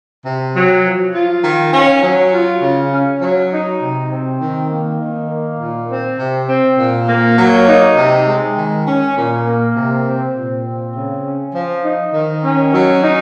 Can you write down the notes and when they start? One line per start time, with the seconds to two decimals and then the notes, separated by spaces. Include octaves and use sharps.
0.25 C3
0.54 F#3
0.84 F3
1.14 F4
1.44 D#3
1.73 C#4
2.03 F#3
2.33 F4
2.62 C#3
2.92 C#4
3.22 F#3
3.52 D#4
3.81 C3
4.11 C4
4.41 D#3
4.71 A#3
5.00 D#3
5.30 A#3
5.60 A#2
5.89 C4
6.19 C3
6.49 C4
6.78 A#2
7.08 A#3
7.38 F#3
7.68 D#4
7.97 C3
8.27 G#3
8.57 D#3
8.87 C#4
9.17 A#2
9.46 A#3
9.76 C3
10.06 C4
10.35 A#2
10.65 C4
10.95 C#3
11.24 C#4
11.55 F3
11.84 D#4
12.13 D#3
12.43 C#4
12.73 F#3
13.03 D#4